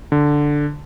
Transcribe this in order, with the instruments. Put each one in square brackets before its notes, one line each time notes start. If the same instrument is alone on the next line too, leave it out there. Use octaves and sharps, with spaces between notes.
[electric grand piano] D3